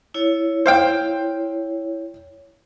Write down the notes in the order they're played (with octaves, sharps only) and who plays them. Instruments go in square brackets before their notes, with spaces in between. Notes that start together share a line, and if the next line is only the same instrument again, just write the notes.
[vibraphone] E4 C#5
[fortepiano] C5 F5 G5